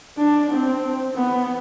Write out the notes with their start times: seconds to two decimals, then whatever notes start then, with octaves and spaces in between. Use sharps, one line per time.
0.18 D4
0.51 C4
1.16 B3